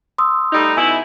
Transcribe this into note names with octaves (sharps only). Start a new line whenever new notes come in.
C6 D#6 E6
G3 A3 D#4
B2 D#4 E4 G#5